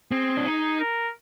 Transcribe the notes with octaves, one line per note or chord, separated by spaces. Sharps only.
C4 G#4
D4
D#4
A#4